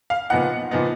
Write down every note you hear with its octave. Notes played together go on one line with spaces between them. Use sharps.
F5
A#2 F3 B3 D#4 F#5
A#2 F3 B3 D#4